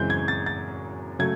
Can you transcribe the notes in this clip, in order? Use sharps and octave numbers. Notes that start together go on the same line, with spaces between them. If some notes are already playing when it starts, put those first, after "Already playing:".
Already playing: F#2 C#3 E3 G#3 C4 G6
G#6
A6
A6
C#3 F#3 A3 G#6